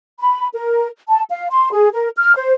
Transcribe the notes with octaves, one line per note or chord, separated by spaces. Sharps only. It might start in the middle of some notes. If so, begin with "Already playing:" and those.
B5
A#4
A5
F5
C6
G#4
A#4
F6
C5